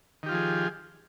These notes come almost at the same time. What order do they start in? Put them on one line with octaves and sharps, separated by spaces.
D#3 G4 F4 F3 G#4